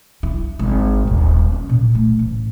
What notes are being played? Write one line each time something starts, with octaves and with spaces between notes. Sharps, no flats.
E4
G#1
D#1
C#4
A#2
A3
A1